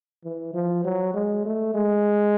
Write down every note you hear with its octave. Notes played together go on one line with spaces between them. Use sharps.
E3
F3
F#3
G#3
A3
G#3